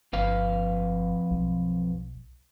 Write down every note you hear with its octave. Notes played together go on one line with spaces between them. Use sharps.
G1 F2 B4 F5
B1